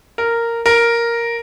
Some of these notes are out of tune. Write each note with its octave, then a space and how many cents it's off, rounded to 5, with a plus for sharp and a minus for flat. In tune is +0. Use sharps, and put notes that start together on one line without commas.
A#4 -10
A#4 +0